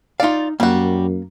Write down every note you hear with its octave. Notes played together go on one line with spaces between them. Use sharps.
D#4 F4 D5 F5
F#2 G3 A#3 F#4